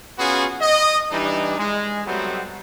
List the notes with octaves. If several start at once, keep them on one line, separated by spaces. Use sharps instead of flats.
B3 C#4 F4 F#4 G#4
D#5
E3 G3 D4 D#4
G#3
F#3 G3 A3 B3 C4